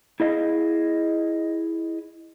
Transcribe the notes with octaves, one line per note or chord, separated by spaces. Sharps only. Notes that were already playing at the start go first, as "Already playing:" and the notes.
E4 G#4 D#5 F5